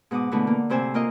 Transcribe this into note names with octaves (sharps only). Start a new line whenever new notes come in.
G#2 B2 F#5 D6 D#6
B2 D3 E3 A3
A#3
A2 C3 C5 G#5 E6
A#3 F4 A#4 D#5